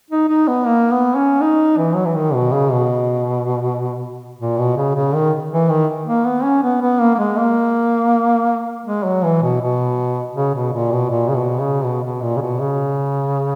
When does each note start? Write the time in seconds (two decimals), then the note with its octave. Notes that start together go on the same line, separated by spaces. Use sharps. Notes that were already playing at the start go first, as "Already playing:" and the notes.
0.10 D#4
0.29 D#4
0.48 B3
0.66 A#3
0.91 B3
1.16 C#4
1.41 D#4
1.78 E3
1.95 F#3
2.05 E3
2.16 D#3
2.34 B2
2.53 C#3
2.72 B2
4.39 A#2
4.58 B2
4.77 C#3
4.95 C#3
5.14 D#3
5.51 E3
5.69 D#3
6.06 A#3
6.25 B3
6.44 C#4
6.63 B3
6.81 B3
7.00 A#3
7.15 A#3
7.18 G#3
7.38 A#3
8.86 G#3
9.05 F#3
9.24 E3
9.42 B2
9.61 B2
10.35 C#3
10.54 B2
10.73 A#2
10.92 B2
11.10 A#2
11.28 C#3
11.35 B2
11.60 C#3
11.85 B2
12.04 B2
12.22 A#2
12.36 C#3
12.41 B2
12.60 C#3